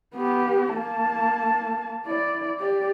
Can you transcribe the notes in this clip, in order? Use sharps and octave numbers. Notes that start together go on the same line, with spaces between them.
B3 G4
A#3 A5
E4 D5
G4 D5